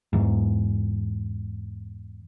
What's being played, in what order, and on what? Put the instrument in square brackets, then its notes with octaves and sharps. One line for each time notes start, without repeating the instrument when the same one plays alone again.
[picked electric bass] E2 G#2